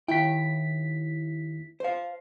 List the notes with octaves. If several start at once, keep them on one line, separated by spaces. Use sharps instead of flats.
D#2 E4 G5 B6
C5 F5